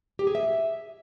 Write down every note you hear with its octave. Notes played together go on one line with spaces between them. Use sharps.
G4
G#4
E5